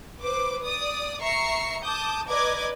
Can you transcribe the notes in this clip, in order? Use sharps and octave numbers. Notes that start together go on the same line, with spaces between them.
B4 C5 D6
D5 D#6
E5 A#5 C#6 C7 C#7
A5 D6 D#6 G6
B4 D5 D#5 A#5 D6 G#6